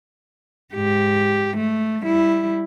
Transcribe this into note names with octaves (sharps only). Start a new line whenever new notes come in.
G#2 G4
A3
G3 E4